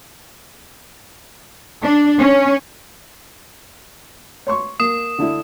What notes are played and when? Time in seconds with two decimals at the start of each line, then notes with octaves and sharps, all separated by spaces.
1.83 D4
2.20 C#4
4.47 C#5 C6 C#6
4.80 A#3 D#6 E7
5.19 D3 D4 E4